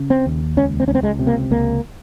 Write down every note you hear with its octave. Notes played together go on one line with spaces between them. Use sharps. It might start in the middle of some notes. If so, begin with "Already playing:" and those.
Already playing: C#3
C4
D#2
C#2 C#4
C4
C#2 C#4
C4
G#3
C3
A#3
C#2 A#3